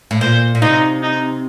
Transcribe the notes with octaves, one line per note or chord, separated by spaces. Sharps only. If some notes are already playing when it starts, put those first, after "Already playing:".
A2
A#2 C5
A#2
C3 D#4
D#4